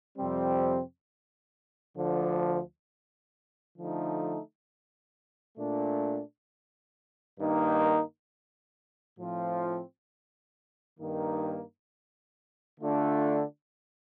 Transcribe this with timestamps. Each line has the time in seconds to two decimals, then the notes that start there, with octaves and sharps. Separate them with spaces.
0.16 F2 C3 G3 C4
1.96 D2 D3 F3
3.76 D3 F3 A3 D#4
5.58 A#2 A3 D4
7.38 G2 D#3 A#3 D#4
9.19 A2 F3 C4 F4
10.99 G2 D#3 A#3 D#4
12.79 D3 A3 D4 F4